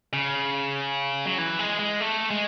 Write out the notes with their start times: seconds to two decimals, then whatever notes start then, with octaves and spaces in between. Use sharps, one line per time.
0.13 C#3
1.26 F#3
1.38 E3
1.59 G#3
1.79 G#3
2.00 A3
2.31 G#3